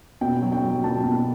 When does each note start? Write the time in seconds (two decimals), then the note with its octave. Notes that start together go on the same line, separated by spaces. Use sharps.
0.21 B2 G5
0.42 F#3
0.52 G5
0.62 F#3
0.84 B2 A5
1.04 B2